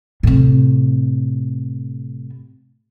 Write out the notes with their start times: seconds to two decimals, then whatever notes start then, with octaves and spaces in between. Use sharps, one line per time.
0.23 A2 C3